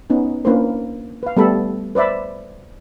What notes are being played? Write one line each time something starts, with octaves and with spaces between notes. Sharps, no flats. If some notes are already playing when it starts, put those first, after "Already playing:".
B3 C#4 D#4
A#3 C#4 D4 E4 B4 C5
B4 F5
G3 A3 B3 G4 A4 B5
B4 C5 D5 E5 B5